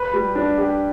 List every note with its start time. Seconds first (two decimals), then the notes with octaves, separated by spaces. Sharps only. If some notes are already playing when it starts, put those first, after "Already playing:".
Already playing: B4
0.13 G3
0.35 D4
0.58 G4